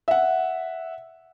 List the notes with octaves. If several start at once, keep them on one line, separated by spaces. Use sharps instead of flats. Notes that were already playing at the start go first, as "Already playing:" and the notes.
E5 F#5